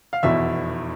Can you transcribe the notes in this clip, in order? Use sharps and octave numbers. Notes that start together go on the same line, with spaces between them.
F5
F1 E2 B2 E5